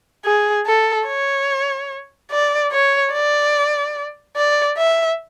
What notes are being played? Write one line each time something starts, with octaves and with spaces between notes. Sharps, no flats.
G#4
A4
C#5
D5
C#5
D5
D5
E5